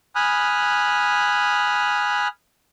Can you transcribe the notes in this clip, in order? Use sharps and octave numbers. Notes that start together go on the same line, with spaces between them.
G#5 B5 D#6 F6 F#6